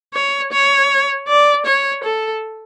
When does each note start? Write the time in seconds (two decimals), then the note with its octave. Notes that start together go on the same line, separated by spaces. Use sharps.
0.14 C#5
0.52 C#5
1.28 D5
1.66 C#5
2.04 A4